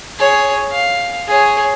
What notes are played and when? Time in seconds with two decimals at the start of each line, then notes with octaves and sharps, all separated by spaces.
0.19 G#4 C#5
0.71 F5
1.27 G#4 C#5